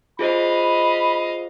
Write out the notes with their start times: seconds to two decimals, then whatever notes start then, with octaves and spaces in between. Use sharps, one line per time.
0.19 F4 G#4 C5 D#5 F5 B5